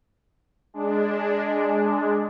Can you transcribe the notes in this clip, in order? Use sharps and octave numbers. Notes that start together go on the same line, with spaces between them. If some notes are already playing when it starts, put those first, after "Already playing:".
G#3 D4